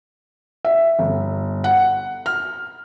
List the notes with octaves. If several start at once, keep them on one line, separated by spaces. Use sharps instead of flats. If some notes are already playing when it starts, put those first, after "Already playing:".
E5
G1
F#5
F6